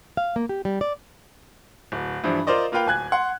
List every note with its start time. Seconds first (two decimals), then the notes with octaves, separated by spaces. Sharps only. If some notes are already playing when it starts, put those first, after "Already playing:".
0.17 F5
0.36 A#3
0.49 G4
0.65 G3
0.81 D5
1.92 D1
2.24 G2 E3 F3 G3
2.47 F4 A#4 C5 D5 D#5
2.72 A#3 F4 B4 F5 G5
2.86 D1 G#5 F#6 G#6
3.12 F#5 C6